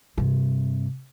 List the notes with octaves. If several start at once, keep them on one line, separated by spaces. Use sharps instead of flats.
G2 C3